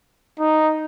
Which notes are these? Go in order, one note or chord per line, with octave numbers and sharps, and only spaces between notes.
D#4